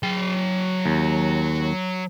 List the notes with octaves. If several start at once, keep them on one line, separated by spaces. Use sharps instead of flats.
F#3 G5
D#2